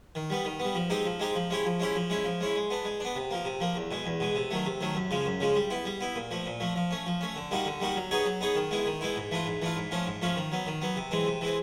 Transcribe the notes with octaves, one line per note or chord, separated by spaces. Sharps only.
D#3
G3 B3
D#3
B3
G3
F3
G#3 C4 D#4 G4
F3
G#3 C4 D#4 G4
F3
G#3 C#4 E4 G4
F3
G#3 C#4 E4 G4
F3
G#3 C#4 E4
F3
G#3 C#4 E4
G#3
B3 D4
G#3
B3 D4
C3
F3 A#3
C3
F3 A#3
E2
B2 G#3
E2
B2 G#3
C3
D#3 F#3 A3
C3
D#3 F#3 A3
F#2
C#3 F3 G#3
F#2
C#3 F3 G#3
G3
B3 E4
G3
B3 E4
A#2
F3 A3
A#2
F3 A3
F3
A3 C#4
F3
A3 C#4
D3
G3 A#3 D#4 F#4
D3
G3 A#3 D#4 F#4
F#3
B3 D#4 G#4 C#5
F#3
B3 D#4 G#4 C#5
D#3
G#3 B3 E4
D#3
G#3 B3 E4
G#2
E3 A3 D4 F4
G#2
E3 A3 D4 F4
G#2
F3 A3 C#4 F4
G#2
F3 A3 C#4 F4
D#3
F#3 B3
D#3
F#3 B3
C3
E3 G#3 C4
C3
E3 G#3 C4